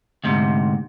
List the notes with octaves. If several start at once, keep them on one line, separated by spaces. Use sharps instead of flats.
D2 G#2 C3